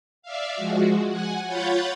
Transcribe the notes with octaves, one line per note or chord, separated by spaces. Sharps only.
D5 E5 F5
F3 G#3 F#4
F#5 G#5
F4 C#5 F#5 B5 G6 A6